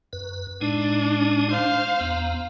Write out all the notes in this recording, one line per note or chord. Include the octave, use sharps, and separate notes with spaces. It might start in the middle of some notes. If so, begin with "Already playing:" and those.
F#2 B4
A2 G#3 D4 D#4
C5 F5
E2 B3 A#5